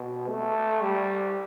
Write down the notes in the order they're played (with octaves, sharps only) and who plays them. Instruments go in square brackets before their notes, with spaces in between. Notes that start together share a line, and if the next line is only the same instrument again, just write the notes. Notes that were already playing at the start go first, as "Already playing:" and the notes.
Already playing: [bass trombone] B2
A3
G3